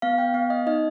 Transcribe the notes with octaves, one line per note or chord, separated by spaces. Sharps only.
B3 F5
G5
B3 F5
D#5
D#4 D#5